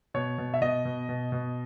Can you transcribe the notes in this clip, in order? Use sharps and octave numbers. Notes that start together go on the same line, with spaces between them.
B2 C#5
B2
E5
B2 D#5
B2
B2
B2